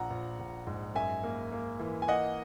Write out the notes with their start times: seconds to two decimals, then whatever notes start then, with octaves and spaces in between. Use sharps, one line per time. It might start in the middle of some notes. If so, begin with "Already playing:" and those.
Already playing: A#1 F#5 A#5
0.10 A#1
0.39 A#1
0.67 G#2
0.95 F#2 E5 G#5
1.24 A#3
1.52 A#3
1.80 E3
2.02 G#5
2.08 A#3 D#5 F#5